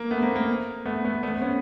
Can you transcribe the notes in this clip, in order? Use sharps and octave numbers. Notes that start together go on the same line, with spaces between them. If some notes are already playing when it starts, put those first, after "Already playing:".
Already playing: A#3
A3 B3
A#3 C4
A#3
A3 B3
A3 B3
A3 B3
C4
B3 C#4